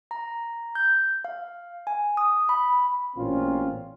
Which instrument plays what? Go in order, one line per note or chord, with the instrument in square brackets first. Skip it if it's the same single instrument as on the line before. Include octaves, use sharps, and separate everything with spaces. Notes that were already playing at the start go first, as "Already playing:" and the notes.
[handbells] A#5
G6
F5
G#5
D#6
B5
[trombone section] A1 A#2 C4 C#4 F4